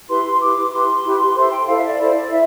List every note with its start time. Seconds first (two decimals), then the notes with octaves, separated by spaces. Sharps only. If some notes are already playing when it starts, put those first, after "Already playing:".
0.09 E4 G4 B4 C6
0.34 C6
0.41 E4 G4 B4 D6
0.72 E4 G4 B4 C6
1.03 E4 G4 B4
1.35 E4 A4 C5 C6
1.51 G5
1.67 E4 A4 C5 F5
1.76 E5
1.83 D5
1.98 E4 A4 C5
2.30 E4 E5